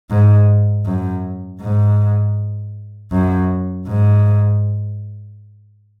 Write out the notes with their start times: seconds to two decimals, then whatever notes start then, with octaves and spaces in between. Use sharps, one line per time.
0.11 G#2
0.86 F#2
1.61 G#2
3.12 F#2
3.88 G#2